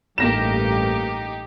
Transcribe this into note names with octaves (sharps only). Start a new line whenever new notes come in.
A1 G2 A#3 D#4 G4 A#6 E7